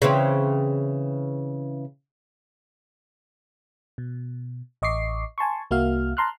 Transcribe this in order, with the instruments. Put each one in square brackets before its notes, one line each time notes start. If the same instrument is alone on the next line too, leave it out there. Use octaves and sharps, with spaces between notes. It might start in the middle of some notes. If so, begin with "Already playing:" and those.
[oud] C#3 E3 C4
[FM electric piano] B2
A1 D#5 C#6 D6 C7
G#5 A5 C6 C#6
C2 A#3 F#4 E5 F5 F6
A5 A#5 C6 F6 F#6